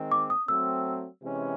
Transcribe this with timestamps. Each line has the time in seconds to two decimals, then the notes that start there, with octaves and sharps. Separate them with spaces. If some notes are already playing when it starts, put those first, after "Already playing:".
Already playing: D#3 G#3 C4
0.12 D6
0.30 D#6
0.48 F#3 A3 C4 E6
1.22 C3 E3 G#3 C#4